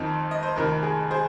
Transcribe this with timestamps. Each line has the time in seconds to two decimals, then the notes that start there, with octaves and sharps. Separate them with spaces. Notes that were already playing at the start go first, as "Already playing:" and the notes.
Already playing: F2 D#3 C4 D#4
0.31 D#5
0.43 C5
0.56 F1 F2 D#3 A#4
0.83 G#4
1.11 G#4 C5